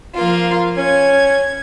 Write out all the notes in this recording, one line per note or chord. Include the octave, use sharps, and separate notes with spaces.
F3 A#3 F4
C#4 G#6